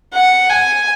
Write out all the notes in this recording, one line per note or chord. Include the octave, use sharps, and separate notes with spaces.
F#5
G#5